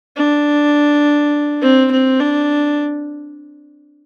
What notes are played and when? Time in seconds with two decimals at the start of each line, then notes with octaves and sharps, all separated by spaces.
0.17 D4
1.61 C4
1.91 C4
2.20 D4